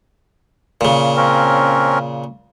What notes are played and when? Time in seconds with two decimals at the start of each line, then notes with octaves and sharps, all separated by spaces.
0.81 A#2 C#3
1.17 C4 C#4 A#4